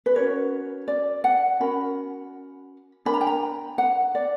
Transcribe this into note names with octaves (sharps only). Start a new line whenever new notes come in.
B4
C#4 F#4 A#4 C#5
D5
F#5
C#4 F#4 A#4 B5
D4 A#4 B5
A#5
G5
A#5
F#5
D5